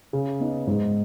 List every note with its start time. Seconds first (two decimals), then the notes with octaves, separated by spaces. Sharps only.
0.13 C#3
0.40 B3 D#4
0.67 G#2